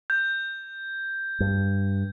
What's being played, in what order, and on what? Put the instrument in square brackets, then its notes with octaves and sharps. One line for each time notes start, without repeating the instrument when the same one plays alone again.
[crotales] G6
[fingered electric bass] G2